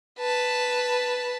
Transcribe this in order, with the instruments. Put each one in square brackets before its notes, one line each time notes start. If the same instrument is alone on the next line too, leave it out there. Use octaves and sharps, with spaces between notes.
[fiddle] B4 A5